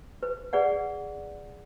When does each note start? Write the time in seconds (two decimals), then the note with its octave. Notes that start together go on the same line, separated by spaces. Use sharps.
0.23 B4
0.53 G#4 B4 D5 F#5